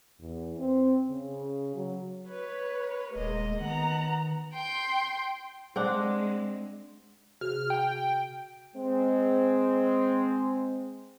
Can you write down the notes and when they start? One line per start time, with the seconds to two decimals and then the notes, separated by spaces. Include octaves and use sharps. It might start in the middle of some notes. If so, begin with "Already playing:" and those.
0.20 E2
0.58 C4
1.08 C#3
1.75 F#3
2.29 B4 C#5
3.16 D#1 G#3 A#3 D#5
3.61 D#3 B3 F#5 A#5
4.54 G5 C6
5.76 G#3 C4 D4 F#5
7.41 C3 F#4 G#4 F6
7.70 G5
8.76 G#3 C4